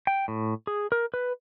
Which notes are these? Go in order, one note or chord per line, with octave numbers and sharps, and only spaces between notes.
G5
A2
G#4
A#4
B4